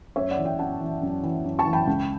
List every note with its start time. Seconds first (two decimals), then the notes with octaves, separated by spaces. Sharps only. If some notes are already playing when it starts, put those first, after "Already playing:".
0.16 F#2 C#5 E5
0.31 D5 F#5
0.37 E3
0.45 E5 G5
0.59 F#2 F#5 A5
0.81 E3
1.02 F#2
1.23 E3
1.44 F#2
1.59 A5 C#6
1.66 E3
1.73 G5 B5
1.87 C#2